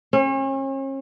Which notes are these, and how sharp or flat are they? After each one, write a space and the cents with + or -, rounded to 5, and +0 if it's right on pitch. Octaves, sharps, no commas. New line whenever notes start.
C#4 -40